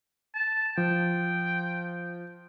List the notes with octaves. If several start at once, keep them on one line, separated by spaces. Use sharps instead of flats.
A5
F3 G5